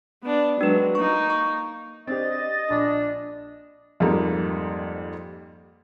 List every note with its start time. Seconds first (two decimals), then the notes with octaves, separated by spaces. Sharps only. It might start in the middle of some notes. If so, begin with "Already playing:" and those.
0.23 B3 D4
0.61 F#3 G#3 D4 B4
0.95 A#3 D#4 C#6
1.30 C#6
2.07 C4 D4 G4 D#5 A6
2.70 A#1 D4
4.00 F2 G#2 G3 A#3